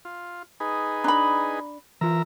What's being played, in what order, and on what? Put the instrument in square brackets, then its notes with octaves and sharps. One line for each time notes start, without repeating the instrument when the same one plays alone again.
[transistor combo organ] F4
D#4 G#4 B4
[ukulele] D4 B5 [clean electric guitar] A#5
[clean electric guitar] E3 F4 [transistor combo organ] A#4 E5 A#5